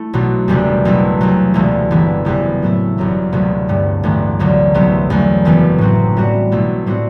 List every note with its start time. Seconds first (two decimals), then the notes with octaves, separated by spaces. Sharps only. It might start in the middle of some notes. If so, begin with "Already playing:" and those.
Already playing: A3 E4
0.13 B1 B2 F#3
0.48 F#1 E2 C3 G3 D4
0.85 B1 B2 A3 E4
1.21 E2 C3 F#3
1.54 E1 D2 C3 E3 A3
1.91 G1 G2 E3 B3 E4
2.25 F#1 E2 C3 G3 B3
2.62 A2 F#3 A3 E4
2.98 G1 F#2 F#3 B3
3.32 E1 D2 C3 F#3 B3
3.68 G2 D3 A3
4.03 A1 G2 D3 A3 D4
4.39 E1 D2 D3 F#3
4.74 C2 C3 F#3 B3
5.10 E2 D3 F#3 A3
5.45 F#1 F#2 E3 B3
5.78 A2 F#3 C4 F#4
6.17 A2 G3 B3 F#4
6.51 B1 B2 A3 E4
6.86 A2 G3 C4 F#4